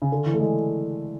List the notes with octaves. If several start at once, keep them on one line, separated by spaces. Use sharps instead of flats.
C#3
D3
E3
A3
G#3